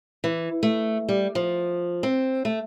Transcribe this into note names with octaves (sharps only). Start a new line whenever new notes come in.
E3
A3
G3
F3
C4
A3